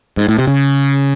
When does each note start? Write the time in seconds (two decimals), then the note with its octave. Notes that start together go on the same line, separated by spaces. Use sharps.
0.17 G#2
0.28 A2
0.39 C3
0.48 C#3